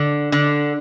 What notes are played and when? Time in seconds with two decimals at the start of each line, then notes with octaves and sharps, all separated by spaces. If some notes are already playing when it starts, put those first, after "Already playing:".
Already playing: D3
0.32 D3